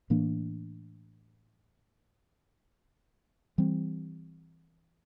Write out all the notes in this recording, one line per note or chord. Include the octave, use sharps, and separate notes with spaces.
A2 E3 A#3 D4
E3 G3 C4